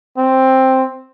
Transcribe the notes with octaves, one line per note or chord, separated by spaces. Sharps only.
C4